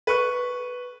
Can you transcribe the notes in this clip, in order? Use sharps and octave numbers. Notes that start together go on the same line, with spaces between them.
B4 C#6 F#6